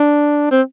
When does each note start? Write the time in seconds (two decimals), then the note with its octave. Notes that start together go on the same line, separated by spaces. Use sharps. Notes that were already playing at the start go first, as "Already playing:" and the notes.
Already playing: D4
0.51 C4